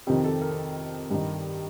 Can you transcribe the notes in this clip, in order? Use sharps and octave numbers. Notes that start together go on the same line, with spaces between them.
F2 C3 D#3 G4
A4
A#4
G2 D#3